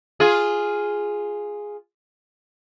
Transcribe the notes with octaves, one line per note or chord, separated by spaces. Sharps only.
F4 G#4